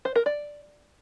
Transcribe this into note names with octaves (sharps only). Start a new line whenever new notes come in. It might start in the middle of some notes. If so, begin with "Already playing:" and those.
C5
A#4
D5